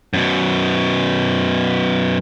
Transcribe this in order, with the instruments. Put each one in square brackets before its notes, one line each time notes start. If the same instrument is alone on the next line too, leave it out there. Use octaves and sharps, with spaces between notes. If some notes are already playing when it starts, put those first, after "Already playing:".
[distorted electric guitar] F#2 B2